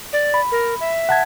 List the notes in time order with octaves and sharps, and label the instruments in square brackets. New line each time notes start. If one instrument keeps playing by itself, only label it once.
[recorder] D5
[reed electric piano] B5
[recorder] A#4
E5
[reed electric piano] F#5 A5 G#6